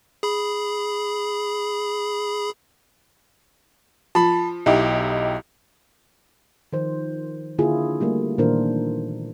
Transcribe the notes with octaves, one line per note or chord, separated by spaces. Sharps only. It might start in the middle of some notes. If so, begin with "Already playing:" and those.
G#4 B5
F3 A5 B5
B1 D#4 E4 G4
D#3 F3 C5
D3 A#3 E4 F4 G#4
G3 A3 A#3
A#2 D#3 E3 D4 A#4 C5